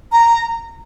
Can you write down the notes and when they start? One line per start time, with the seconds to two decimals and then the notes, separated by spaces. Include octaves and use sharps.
0.12 A#5